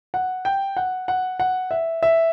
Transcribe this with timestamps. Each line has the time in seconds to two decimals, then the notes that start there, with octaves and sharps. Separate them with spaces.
0.14 F#5
0.45 G5
0.77 F#5
1.08 F#5
1.40 F#5
1.71 E5
2.03 E5